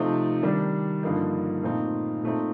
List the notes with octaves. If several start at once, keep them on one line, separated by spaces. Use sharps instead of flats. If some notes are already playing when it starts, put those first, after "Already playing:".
Already playing: C3 F3 A3 C4 D#4
D#3 G3 D4
G2 D3 F3 A#3 D#4
A#2 A3 C4 D#4
A#2 A3 C4 D#4